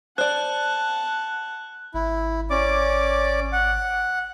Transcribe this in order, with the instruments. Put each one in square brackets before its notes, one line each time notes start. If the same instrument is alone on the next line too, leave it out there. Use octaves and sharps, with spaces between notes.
[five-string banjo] C5 D5 [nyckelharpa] F#5 A5 [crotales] F#6
[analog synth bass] G#1 [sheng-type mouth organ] E4
[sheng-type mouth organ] C#4 D5 D6
F#5